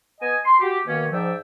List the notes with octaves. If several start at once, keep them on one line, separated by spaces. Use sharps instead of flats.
B3 D#5 G#5
C6
F#4 G4
B2 D#3 A#3 C#4
G#2 F3 D5 E5 G5